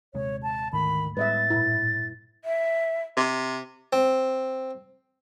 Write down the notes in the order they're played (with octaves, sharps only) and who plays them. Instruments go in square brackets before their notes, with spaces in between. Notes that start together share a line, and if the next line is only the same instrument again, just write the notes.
[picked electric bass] D#1 C3 G#3 [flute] C#5
[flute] A5
[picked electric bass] D2 G#2 A3 [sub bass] D#3 [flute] B5
[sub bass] A2 [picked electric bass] G3 G#3 B3 [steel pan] B4 D#5 E5 [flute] A6
[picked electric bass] G2 A#2 [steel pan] E4
[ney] E5
[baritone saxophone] C3
[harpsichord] C4